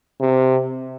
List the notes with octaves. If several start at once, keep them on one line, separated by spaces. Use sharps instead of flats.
C3